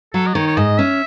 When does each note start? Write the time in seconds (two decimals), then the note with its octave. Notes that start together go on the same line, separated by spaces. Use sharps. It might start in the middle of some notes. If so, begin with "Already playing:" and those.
0.14 F#3 A4
0.27 D#5
0.35 D#3 C#5
0.47 C#5
0.57 G#2 D#5
0.78 C#4 E5